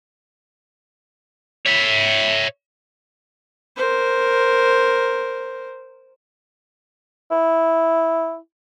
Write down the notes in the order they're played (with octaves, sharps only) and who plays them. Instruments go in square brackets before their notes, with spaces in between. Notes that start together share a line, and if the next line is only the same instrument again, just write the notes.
[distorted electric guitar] C#5 E5
[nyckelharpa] A#4 C5
[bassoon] E4